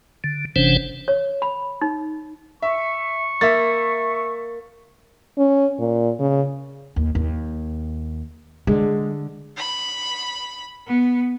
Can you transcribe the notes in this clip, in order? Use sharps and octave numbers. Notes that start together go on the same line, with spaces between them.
D3
F#1 C3 E3 C#4 D4 C5
C#5
B5
D#4
E5 C#6
A#3 E5 A6
C#4
A#2
C#3
D#2
D#2
D3 G#3
B5
B3